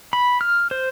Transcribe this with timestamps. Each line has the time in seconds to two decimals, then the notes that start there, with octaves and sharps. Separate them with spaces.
0.13 B5
0.41 F6
0.71 C5